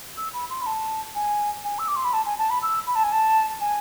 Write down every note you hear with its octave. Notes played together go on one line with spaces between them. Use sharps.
E6
B5
C6
B5
A5
G#5
G#5
E6
D6
C6
B5
A5
G#5
A5
B5
E6
B5
A5
G#5
A5
G#5